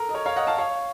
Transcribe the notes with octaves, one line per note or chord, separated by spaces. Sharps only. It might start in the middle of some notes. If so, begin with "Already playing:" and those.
Already playing: A4 A#4
D#5
A#4 C#5
C#5 F5
D#5 F#5
F5 A5
C#5 F5